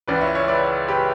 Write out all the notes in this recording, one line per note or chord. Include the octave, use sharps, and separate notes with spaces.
C#2 C#3 E3 B4 D5
C#5 E5
C#5 E5
B4 D5
G4 B4